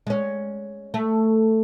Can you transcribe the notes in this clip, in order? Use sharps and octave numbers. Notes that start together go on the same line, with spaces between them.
G#3 C#4
A3